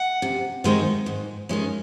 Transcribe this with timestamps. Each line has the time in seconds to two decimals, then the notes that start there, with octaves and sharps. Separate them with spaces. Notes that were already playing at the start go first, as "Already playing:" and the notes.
Already playing: F#5
0.22 C3
0.64 D#3 G#3 C4 D#4
1.06 G#2
1.49 D#3 G#3 C#4